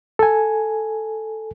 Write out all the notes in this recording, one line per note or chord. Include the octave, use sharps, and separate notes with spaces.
A4 G#5